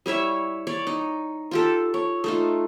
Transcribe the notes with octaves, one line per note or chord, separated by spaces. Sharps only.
G3 E4 C#5 E5
C#5 D5
D#4
F4 G4 A4
C#5
A3 D#4 F4